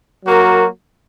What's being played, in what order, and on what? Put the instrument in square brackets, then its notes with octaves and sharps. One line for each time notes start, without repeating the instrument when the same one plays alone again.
[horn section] F#3 A#3 F#4 A#4